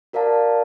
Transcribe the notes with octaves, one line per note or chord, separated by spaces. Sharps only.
F#4 A#4 D5 F5 A5